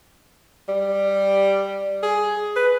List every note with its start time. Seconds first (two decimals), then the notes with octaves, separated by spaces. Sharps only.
0.69 G3
2.03 G#4
2.56 B4